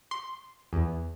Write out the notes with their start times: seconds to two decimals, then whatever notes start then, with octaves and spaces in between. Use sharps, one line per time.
0.11 C6
0.73 E2